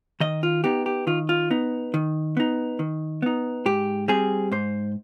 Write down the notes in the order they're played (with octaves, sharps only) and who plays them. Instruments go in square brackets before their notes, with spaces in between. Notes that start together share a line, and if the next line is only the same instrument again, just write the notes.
[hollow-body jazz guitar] D#3 D#5
F4
B3 D#4 G4
G4
D#3 F4
F4
B3 D#4
D#3
B3 D#4
D#3
B3 D#4
G#2 G4
G3 C4 G#4
G#2 C5